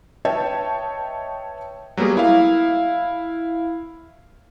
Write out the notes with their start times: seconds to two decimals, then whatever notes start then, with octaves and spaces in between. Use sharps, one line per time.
0.25 B4 C#5 D#5 E5 G5 A5
1.97 F#3 G3 A#3 B3 G#4
2.17 E4 F5